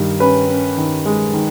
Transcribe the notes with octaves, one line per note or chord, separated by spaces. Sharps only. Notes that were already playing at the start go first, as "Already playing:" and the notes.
Already playing: G2 D#3
C#4 B4
C#4
D#3
G#3
D#3